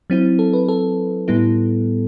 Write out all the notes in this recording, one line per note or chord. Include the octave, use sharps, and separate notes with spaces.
F#3 C4 E4
A4
B4
A4
A2 G3 B3 E4